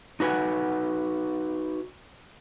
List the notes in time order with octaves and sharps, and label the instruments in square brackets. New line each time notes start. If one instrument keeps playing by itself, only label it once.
[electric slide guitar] D#4 F#4 B4 F#5 G#5